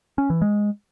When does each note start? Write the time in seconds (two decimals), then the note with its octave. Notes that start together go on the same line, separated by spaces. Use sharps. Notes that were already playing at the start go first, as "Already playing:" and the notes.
0.18 C#4
0.30 E3
0.42 G#3